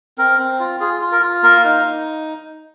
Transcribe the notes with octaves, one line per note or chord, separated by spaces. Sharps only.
C4 A#4
C4
F4
F4 G#4
F4
A#4
F4
A#3 A#4
D#4
D#4